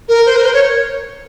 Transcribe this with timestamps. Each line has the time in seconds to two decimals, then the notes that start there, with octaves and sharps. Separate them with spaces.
0.09 A#4
0.26 C5
0.36 A#4
0.46 C5
0.54 C#5